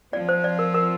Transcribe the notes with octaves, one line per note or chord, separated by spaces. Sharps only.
F3 C4 F4 D5
C5
D5
A#4
A#4